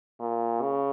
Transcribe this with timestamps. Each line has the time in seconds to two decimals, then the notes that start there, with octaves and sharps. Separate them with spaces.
0.20 A#2
0.61 C#3